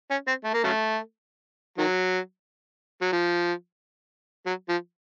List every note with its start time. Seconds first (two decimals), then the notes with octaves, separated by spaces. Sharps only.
0.10 C#4
0.27 C4
0.44 A3
0.53 A#3
0.63 C#3 F#3 A3
1.78 D#3 F#3
3.01 F#3
3.12 F3
4.46 F#3
4.69 F3